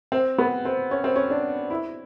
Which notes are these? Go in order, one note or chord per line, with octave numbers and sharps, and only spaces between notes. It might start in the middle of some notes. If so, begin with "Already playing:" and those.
C4
B3
C4
C#4
C4
C#4
D4
E4